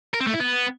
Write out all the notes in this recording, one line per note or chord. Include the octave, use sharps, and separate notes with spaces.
A#4
C4
A3
E4
B3